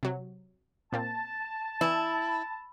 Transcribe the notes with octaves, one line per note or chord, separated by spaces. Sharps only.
C3 F#3
A#2 A#3 C4 A5
E3 E4 G#5